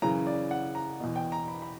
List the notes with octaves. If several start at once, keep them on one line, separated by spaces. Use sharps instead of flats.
F#2 C#3 E3 A#5
D5
F#5
A#5
E2 B2
G5
A#5
B5
B5